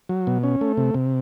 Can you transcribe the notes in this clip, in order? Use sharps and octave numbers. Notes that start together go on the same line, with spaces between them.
F#3
B2
C#4
A3
C3
C3